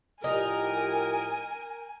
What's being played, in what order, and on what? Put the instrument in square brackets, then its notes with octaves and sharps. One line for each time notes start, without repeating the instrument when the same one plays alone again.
[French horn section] A2 F3 G4 [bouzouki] D#4 [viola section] A#4 [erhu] G#5